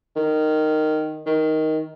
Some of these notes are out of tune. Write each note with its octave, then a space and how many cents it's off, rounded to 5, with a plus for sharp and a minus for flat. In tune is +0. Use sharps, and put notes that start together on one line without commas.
D#3 -10
D#3 +10